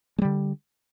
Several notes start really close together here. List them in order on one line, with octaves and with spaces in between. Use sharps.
G#3 G3 D3